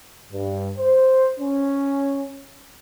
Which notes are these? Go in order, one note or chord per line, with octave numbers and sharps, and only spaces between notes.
G2
C5
C#4